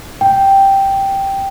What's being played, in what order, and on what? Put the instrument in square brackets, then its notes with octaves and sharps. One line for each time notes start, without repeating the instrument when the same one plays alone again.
[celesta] G5